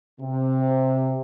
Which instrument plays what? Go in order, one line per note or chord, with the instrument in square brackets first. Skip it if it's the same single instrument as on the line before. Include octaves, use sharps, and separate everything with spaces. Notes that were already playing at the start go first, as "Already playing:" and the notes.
[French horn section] C3